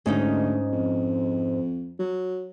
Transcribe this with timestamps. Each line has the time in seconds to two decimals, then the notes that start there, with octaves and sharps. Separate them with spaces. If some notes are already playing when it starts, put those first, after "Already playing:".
0.06 D2 G#2 C#4 D#4
0.73 F2
1.99 F#3